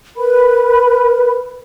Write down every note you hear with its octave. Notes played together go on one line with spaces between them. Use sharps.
A#4 B4 B5